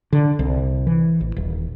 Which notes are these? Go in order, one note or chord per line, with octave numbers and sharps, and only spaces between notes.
D3
C2
E3
A1
D#1